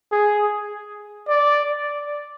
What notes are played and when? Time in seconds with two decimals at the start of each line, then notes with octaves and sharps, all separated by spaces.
0.12 G#4
1.28 D5